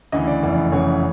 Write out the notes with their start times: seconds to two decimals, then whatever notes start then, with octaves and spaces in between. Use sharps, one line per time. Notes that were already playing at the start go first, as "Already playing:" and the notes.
0.12 D2 C#3 E3 D#5
0.27 D5
0.43 F1 E2 C#3 E3
0.72 F1 E2 C#3 E3 C#5